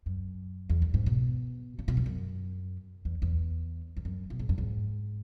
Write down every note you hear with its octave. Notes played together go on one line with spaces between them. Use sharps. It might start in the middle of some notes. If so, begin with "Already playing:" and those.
F#2
E2
F#2
G#2
B2
C#3
B2
G#2
F#2
E2
E2
E2
F#2
B2
G#2
F#2
G#2